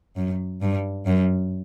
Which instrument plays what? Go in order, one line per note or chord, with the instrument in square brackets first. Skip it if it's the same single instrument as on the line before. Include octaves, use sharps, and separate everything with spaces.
[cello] F#2
G2
F#2